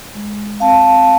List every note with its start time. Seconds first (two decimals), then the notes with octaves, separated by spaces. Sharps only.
0.14 G#3
0.60 C4 F5 A5